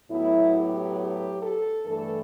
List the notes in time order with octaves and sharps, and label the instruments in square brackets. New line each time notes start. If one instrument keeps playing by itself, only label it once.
[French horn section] A2 F#3 B3 E4
G4
G4
A4
G2 E3 A3 A4